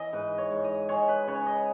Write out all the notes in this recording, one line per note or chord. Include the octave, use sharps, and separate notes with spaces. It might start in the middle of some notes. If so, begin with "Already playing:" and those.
Already playing: E3 D#5
G#2 B4
C#5
G#2
D#5
G#3 C#5
B4
C#3 C#5
D#5